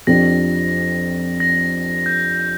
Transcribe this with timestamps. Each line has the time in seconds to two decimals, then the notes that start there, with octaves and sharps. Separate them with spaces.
0.07 F2 F3 D4 G4 A#6
1.40 A#6
2.06 G6